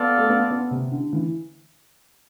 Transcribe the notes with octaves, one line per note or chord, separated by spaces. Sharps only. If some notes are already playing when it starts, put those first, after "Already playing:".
Already playing: B3 F4 A4 D5 F5
A3
B3
B3
C3
D3
E3